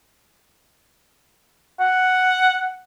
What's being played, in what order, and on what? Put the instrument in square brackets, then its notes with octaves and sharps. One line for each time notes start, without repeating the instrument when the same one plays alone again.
[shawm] F#5